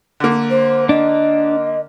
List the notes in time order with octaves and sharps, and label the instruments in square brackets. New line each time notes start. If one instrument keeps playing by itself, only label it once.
[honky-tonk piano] D3 A#3
[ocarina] C5
[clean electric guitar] D4 [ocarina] D#5